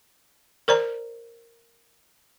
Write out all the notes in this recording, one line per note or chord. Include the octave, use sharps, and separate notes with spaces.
A#4 C5 D5 A#5